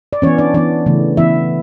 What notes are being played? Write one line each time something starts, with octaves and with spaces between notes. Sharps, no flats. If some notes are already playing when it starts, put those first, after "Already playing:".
D5
E3 B3 C#4 C#5
D4 D5
E3 B3 D4 D5
C#3 E3 A3
E3 B3 E4 E5